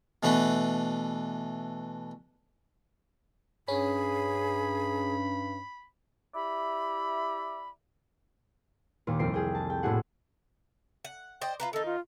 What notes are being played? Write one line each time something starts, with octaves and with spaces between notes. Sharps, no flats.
B2 E3 A3 D4 B4
G2 C#4 G#4 B5
E4 G4 D5 E5 B5
D#2 A#2
C2 F2 C4 C7 D7
G#4 G5
A5
G5
A#1 A2 E4 F#4 G#4 F#5
F#5
C5 D5 D#5 G5
F4 F#4 B4 A#5
D#3 D#4 A4
F4